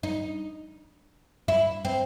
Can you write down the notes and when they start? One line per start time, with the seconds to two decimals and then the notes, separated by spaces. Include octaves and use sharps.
0.03 D#4
1.48 E4
1.85 C4